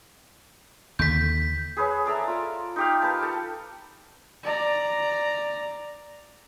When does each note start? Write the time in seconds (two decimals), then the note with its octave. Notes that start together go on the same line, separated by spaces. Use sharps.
0.99 D#2 D3 G6 B6
1.77 G#4 B4 C#5 E6
2.06 A4 D5 E5 A#5
2.28 F4
2.76 D#4 G4 F5
3.02 A#4 B4 A5
3.22 A4
4.43 D5 A#5